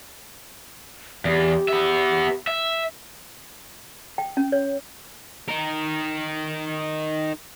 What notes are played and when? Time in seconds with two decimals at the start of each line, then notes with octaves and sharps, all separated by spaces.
1.25 E2 G4
1.68 B3 E5
2.47 E5
4.18 G5
4.37 C#4
4.52 C#5
5.48 D#4 A#4